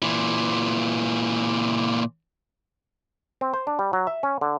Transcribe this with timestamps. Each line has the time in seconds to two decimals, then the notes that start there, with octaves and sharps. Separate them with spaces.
0.02 A#2 E3
3.41 C4
3.54 C5
3.67 D4
3.79 G3
3.93 F#3
4.07 E5
4.23 C#4
4.41 D3